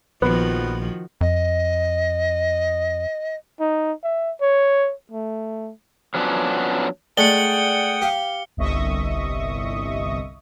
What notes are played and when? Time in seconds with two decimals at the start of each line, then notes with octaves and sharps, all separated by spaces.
0.22 A#1 D#3 F3 B3 F#4
1.21 F2 D#5
3.60 D#4
4.04 E5
4.41 C#5
5.12 A3
6.14 F3 F#3 B3 C#4 D4
7.17 G#3 A3 D5 F#5 G5 D#6 C#7 G7
8.02 G4 F5
8.57 G1 C2 D#5 E5 C#6 D#6